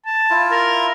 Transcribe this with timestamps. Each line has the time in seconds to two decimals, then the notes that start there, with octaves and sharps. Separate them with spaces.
0.06 A5
0.30 E4 F4
0.51 A#4